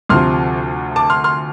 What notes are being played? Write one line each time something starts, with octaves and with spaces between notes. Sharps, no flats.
D2 C3 F3 C6 F6
A5 D6
C6 F6
C6 F6